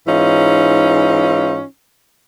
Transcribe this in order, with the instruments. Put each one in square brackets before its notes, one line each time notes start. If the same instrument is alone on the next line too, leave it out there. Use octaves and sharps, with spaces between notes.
[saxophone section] G#2 E3 C#4 D#4 F4